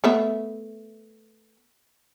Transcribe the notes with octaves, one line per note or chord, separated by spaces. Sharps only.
A3 B3 E5